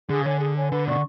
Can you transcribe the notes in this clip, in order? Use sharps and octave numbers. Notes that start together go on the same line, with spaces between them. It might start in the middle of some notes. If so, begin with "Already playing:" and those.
D3 G#4
C#3
D3 C#5 G#5
G#4
C#5 G#5
D3 B4
B2 D5 F#5 C#6